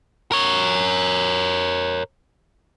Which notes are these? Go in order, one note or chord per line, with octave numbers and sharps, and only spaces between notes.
A#4 C#5